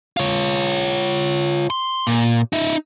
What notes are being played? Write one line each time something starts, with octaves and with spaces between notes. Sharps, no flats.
F4 C#5
C6
A#2
D#4 E5